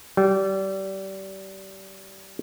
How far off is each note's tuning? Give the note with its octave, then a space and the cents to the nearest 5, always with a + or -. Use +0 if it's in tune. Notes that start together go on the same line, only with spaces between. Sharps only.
G3 -30